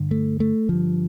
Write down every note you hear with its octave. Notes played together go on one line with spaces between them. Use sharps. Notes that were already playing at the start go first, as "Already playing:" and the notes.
Already playing: G2 D3
A3
A3
G2 D3 F3